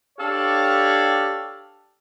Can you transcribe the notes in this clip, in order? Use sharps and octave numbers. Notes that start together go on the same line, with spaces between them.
D4 G4 A4 C#5 F5